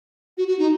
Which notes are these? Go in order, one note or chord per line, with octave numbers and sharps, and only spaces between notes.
F#4
F#4
D#4